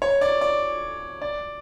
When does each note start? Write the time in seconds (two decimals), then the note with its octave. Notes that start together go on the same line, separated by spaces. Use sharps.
0.02 C#5
0.21 D5
0.41 D5
1.22 D5